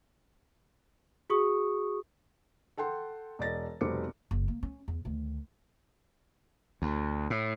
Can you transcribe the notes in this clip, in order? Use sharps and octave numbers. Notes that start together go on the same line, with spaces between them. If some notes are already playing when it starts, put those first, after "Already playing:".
F#4 G#4 C#6 D#6
A4 F#5 G5 C6
E1 D5 D#5 A6 A#6
F1 B2 G3 C5 D6 C#7
F#1
A#3
C#4
E2
D2 D#3
D2
A2